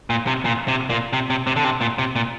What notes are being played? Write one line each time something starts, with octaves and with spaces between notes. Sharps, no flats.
A#2
C3
A#2
C3
A#2
C3
C3
C3
D3
C3
A#2
C3
A#2